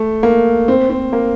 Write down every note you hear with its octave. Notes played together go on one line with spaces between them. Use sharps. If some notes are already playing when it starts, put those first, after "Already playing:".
Already playing: A3
A#3
C4
C4
A#3